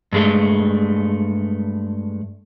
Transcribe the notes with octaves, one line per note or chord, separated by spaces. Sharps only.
G2 G#3 A3